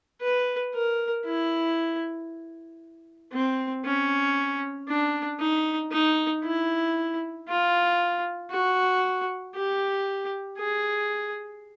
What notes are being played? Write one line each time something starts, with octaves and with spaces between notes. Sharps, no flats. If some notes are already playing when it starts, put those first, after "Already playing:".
B4
A#4
E4
C4
C#4
D4
D#4
D#4
E4
F4
F#4
G4
G#4